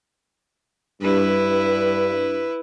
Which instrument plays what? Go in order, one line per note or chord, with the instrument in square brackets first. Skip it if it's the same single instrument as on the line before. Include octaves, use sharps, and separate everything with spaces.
[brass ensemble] G2 [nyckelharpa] E4 B4